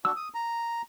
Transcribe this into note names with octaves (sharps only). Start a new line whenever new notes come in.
D4 F#4 E6
D#6
A#5